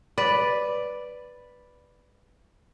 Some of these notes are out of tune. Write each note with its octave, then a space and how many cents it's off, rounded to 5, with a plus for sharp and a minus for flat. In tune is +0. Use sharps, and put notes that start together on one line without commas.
B4 +0 D5 +0